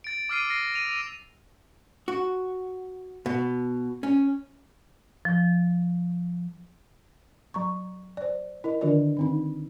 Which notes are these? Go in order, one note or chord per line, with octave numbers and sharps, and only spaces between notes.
A6 D7
D6 E6 F6 A6 C7 D#7
A#6 C7
D#7 F7
D#7 F7
F#4
B2
C#4
F3
F#3 A#5 C#6
C5 D5
E4 A#4 D#5
D3 D#3 D4 F4 A#4 D5
D#3 C4 D#4